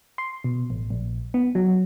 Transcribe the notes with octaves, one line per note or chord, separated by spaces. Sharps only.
C6
B2
A1
A#1
B3
F#3